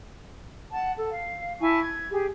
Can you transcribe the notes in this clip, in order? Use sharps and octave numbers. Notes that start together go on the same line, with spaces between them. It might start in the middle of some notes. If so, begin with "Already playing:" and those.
F#5 A5
A4
F5
E4 G#5 A5 C#6
G#6
G4 G#4